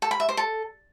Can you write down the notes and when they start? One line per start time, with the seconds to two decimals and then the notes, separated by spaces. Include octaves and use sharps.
0.02 A4
0.11 B5
0.20 E5
0.29 C5
0.37 A4